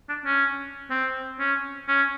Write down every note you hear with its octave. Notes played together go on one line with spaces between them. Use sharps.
D4
C#4
C4
C#4
C#4